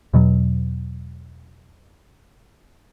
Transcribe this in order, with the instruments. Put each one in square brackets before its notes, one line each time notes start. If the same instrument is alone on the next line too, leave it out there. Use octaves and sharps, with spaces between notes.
[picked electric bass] E2 B2 F#3